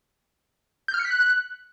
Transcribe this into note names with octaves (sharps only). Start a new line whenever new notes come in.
G6
F6
C#7
B6
F#6